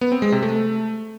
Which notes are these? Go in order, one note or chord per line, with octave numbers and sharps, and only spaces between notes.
B3
C4
G#3
C3
A3